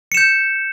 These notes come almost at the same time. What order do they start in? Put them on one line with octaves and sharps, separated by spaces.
C#7 E7 G6